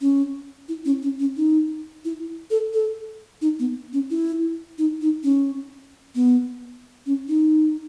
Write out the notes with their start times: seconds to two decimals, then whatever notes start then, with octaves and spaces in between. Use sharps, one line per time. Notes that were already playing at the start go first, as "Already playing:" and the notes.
0.01 C#4
0.69 E4
0.85 C#4
1.03 C#4
1.20 C#4
1.37 D#4
2.05 E4
2.51 A4
2.74 A4
3.42 D#4
3.59 B3
3.93 C#4
4.11 E4
4.78 D#4
5.02 D#4
5.23 C#4
6.15 B3
7.06 C#4
7.28 D#4